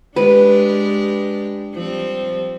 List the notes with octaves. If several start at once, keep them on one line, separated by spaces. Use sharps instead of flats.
G#3 D4 G4 B4
F3 G3 C4